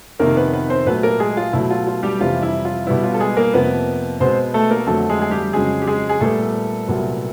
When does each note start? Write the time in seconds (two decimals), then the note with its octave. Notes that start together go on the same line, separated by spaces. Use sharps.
0.19 F2 C3 D#3 A#3 A#4
0.37 B3 B4
0.53 B3 B4
0.70 C4 C5
0.86 A#2 F#3 A3 B3 B4
1.03 A#3 A#4
1.19 G#3 G#4
1.37 F4
1.53 B2 F#3 A3 E4
1.71 F4
1.87 F4
2.03 G3 G4
2.20 F2 C3 E3 G3 F4
2.43 E4
2.65 F4
2.87 B2 G3 B3 E4
3.03 F4
3.14 A4
3.20 G#3 G#4
3.37 A#3 A#4
3.53 F2 C3 F3 A#3 B3 B4
4.20 B2 G#3 B3 C4 C5
4.54 A3 A4
4.71 A#3 A#4
4.87 F2 D3 F#3 A3 A4
5.09 G#3 G#4
5.22 G#4
5.31 G3 G4
5.53 F2 C#3 F#3 G#3 G#4
5.82 G4
5.87 G#3 G#4
6.09 G#4
6.21 A#2 G3 A3 B3 A4
6.87 C2 A#2 F#3 B3